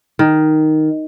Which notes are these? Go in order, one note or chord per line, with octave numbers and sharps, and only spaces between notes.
D#3